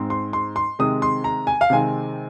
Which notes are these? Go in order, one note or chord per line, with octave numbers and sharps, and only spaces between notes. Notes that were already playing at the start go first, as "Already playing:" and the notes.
Already playing: G#2 G#3 C4
C6
C6
C6
C3 D#3 G#3 C4 D#6
C6
A#5
G#5
F5
C3 D#3 G#3 C4 G#5